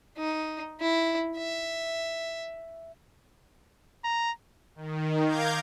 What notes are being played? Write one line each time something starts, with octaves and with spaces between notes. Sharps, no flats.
D#4
E4
E5
A#5
D#3
F5 A#5 D6 G6 G#6